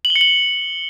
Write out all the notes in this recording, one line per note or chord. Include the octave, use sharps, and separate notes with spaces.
F#7
G7
C#7
F#7